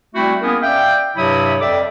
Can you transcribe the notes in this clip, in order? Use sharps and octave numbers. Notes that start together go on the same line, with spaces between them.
G3 A3 C4 E4 F#4
A#3 B3 C#4 E4 G#4 A#4
D5 E5 F5 G5
G2 C3 F#3 E4 E5 D#6
F2 A4 D5 E5 G5 D6